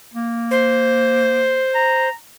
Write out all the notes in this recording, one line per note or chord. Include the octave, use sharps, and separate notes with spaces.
A#3
C5
A#5